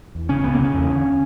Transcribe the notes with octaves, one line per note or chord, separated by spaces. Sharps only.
E2
C#3 C#4
C#2 B3
A#3
C#3
C#4
E2
D3